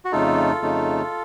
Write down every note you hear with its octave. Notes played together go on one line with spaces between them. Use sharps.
F#4
F2 C#3 A3 D#4 F4 A4
F2 C#3 A3 D#4